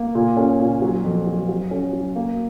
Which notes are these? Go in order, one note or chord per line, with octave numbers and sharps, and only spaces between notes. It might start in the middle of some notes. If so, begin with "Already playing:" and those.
Already playing: A#3
A#2
C#4
A#2
F#3
F2
F#3
F#3
C#4
F#3
A#3